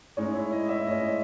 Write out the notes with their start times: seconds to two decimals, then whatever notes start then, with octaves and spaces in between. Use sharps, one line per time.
0.17 A2 G#3 C#4 D#4
0.35 E4
0.52 D#5
0.69 E5
0.87 A2 G#3 C#4 D#5